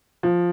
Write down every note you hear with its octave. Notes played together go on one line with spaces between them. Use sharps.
F3